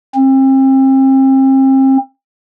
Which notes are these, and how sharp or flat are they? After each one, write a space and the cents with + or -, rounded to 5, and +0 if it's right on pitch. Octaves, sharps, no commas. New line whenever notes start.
C4 +35